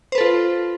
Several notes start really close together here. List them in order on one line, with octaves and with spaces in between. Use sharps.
C5 B4 A4 F4